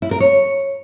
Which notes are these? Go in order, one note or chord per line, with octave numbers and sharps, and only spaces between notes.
E4
A#4
C#5